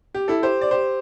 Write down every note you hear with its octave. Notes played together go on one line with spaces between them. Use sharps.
G4
E4 A4
G4 C5
D5
G4 C5